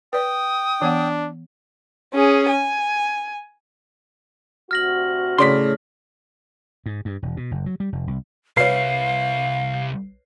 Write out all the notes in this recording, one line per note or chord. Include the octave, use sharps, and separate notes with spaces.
B4 D5 G5 D#6
E3 B3 D4 F#5
C#4 G#4
G#5
D2 C3 F#4 F6 A#6 F#7
A2 C#3 D5 C6 B6
G#2
G2
E1
B2
F#1
F#3
G3
F1
C2
C2 E4 B4 C#5 F5 C7